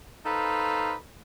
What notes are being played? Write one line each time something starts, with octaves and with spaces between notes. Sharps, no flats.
D#4 A4 B4 C5 F5